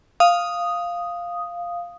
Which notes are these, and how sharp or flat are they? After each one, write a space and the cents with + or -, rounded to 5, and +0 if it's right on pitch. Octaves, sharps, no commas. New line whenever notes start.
F5 +0 D#6 +0